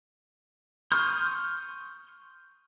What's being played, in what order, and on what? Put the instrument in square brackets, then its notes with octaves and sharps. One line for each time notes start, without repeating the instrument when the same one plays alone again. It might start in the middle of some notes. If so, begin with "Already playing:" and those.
[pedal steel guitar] C6 C#6 D#6 F6 G6